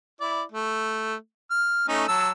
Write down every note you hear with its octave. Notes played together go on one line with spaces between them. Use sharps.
E4 D5
A3
F6
A3 C#4 D#4
F#3 A5 E6